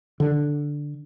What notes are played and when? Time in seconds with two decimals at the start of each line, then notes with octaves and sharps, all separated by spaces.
0.20 D3